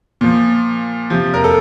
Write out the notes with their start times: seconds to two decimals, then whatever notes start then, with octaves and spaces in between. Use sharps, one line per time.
0.21 A#2 F3
1.10 C3 F3
1.34 A#4
1.44 A4